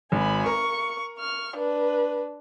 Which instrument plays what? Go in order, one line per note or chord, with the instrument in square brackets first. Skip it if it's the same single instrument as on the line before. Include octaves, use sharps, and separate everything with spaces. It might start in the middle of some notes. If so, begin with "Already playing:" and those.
[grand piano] G#1 [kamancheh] G#5 B5
[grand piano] A#4 [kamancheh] C#6
[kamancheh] C#6 F6
D4 B4